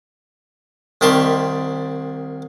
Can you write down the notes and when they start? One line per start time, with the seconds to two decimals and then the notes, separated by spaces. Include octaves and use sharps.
1.01 C2 D#3 G4 A5 C6 C#6